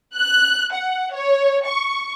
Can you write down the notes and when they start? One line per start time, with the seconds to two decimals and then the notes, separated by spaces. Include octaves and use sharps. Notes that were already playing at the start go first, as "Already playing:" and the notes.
0.16 F#6
0.73 F#5
1.12 C#5
1.67 C#6